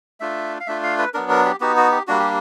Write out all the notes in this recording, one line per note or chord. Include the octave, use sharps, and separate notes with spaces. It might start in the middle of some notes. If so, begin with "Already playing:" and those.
A3 D4 F4 E5
F5
A3 D4 F4 E5
F5
B4
F#3 B3 D4 A#4
A#4
G4
B3 D#4 F#4 G4
F#4
G4
G3 A#3 D4 F#4
G4